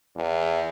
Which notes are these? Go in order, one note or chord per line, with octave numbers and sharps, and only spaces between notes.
E2